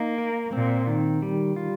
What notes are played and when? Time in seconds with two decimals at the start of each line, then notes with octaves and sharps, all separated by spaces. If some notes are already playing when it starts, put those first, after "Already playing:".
Already playing: A#3 D#4
0.18 A#4
0.53 A#2 C4
0.87 D#3
1.22 G3
1.56 F4